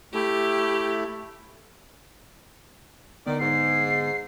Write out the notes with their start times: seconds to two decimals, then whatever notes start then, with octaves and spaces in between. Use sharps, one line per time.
0.14 A3 E4 G4
3.27 D3 D#3 B3 D5
3.40 G#2 C7